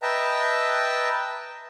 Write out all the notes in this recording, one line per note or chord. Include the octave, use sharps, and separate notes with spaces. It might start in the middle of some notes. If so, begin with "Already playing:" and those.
B4 D#5 E5 G5 A5 A#5